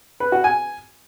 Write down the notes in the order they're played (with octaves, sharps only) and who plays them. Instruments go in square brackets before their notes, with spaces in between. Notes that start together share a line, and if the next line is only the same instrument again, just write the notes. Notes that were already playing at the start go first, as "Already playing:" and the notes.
[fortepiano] B4
F#4
G#5